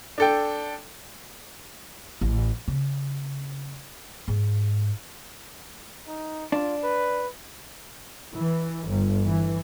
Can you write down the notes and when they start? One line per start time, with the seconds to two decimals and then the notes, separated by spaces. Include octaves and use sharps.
0.18 D4 A4 G5
2.21 A1
2.68 C#3
4.28 G#2
6.07 D#4
6.52 D4 F4
6.83 B4
8.34 E3
8.88 G1
9.27 E3